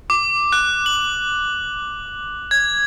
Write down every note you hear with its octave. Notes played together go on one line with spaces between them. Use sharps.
D6
F#6
F#7
G#6